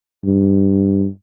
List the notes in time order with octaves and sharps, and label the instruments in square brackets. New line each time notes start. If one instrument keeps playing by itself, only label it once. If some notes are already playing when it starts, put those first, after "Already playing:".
[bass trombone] G2